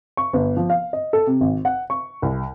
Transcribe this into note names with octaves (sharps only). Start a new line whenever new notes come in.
C#6
G1
F3
F5
D#5
A4
C3
G#1
F#5
C#6
C2